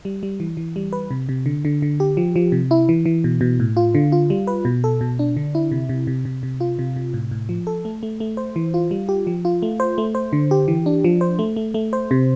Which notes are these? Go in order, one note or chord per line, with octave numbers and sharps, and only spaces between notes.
G3
G3
E3
E3
G3
B4
C3
C3
D3
D3
D3
G4
F3
F3
C3
E4
E3
E3
B2
B2
A2
F4
D3
F4
G3
B4
B2
A4
B2
D4
D3
E4
C3
C3
C3
C3
C3
F4
C3
C3
A2
A2
F3
A4
A3
A3
A3
C5
E3
F4
G3
G4
F3
F4
A3
C5
A3
C5
D3
G4
E3
D4
F3
C5
A3
A3
A3
C5
C3